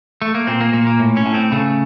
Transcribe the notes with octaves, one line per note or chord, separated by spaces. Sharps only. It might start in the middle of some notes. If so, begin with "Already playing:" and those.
A3
A#3
A#2 C4
A#3
A#2 A#3
A#3
A2
C#4
A2
C4
C#3 A3